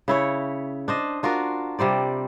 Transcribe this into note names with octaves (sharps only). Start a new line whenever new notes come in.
C#3 E4 C#5
D4 C5 D#5
D4 F4 F#4 A#4
C3 G3 C5 D5